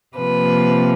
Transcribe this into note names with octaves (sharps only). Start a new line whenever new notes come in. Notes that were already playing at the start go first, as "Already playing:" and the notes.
C3 F3 A#3 B4